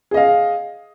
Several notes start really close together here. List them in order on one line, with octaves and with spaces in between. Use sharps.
G#4 D#5 F5